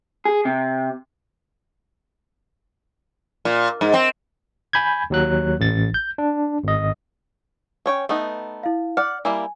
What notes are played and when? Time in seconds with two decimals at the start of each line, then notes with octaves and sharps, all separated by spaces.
0.25 G#4
0.45 C3
3.45 A#2
3.81 G#2
3.94 C4
4.73 G#5 B5 G6 G#6
5.10 D#2 F#3 F#6
5.60 A1 A6
5.94 G6
6.18 D4
6.64 G#1 D#5
7.86 C#4 C#5 G5
8.09 A3 B3 D#4
8.63 E4 F5
8.97 D5 F#5 F6
9.25 G3 A#3 E4 G#5